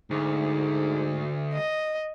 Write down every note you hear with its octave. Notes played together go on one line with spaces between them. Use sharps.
D2 G#2
D#5